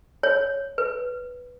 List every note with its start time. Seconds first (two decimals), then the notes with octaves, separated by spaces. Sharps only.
0.23 C#5
0.78 B4